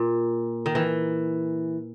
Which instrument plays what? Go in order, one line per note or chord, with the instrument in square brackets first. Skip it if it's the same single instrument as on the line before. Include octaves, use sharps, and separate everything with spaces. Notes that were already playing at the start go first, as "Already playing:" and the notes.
Already playing: [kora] A#2
D#3
E3